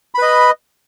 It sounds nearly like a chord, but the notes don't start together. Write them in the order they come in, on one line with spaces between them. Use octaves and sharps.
B5 B4 D#5